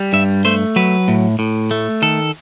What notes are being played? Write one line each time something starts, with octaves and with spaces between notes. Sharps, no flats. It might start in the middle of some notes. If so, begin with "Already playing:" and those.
Already playing: G3
G2 E5
A3 C5
F#3 B4
A2
A2
A3
D#3 A4